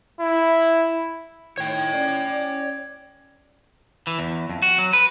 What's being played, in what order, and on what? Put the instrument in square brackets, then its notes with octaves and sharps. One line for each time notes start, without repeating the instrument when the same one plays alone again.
[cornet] E4
[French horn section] A2 D#3 [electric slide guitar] C#5 G5
[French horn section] C#4 D5
[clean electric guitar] E3
E2
F2
F#4
F#3
B4